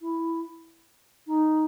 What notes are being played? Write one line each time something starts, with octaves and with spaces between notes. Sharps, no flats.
E4
D#4